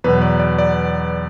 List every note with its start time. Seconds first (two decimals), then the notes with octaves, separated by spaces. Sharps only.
0.04 E2 B2 F#3 B4
0.21 D5
0.39 D5
0.58 D5